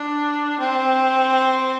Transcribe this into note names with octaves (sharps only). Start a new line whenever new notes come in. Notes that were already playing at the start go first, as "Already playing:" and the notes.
Already playing: D4
C4